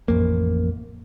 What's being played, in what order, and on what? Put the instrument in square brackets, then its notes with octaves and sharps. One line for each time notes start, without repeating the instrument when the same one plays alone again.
[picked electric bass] A1 F2 A#3